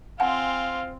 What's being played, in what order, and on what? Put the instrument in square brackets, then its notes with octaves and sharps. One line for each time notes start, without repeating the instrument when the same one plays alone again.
[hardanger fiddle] C4 F4 [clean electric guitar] C5 G#5 [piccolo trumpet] F5 [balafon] F#5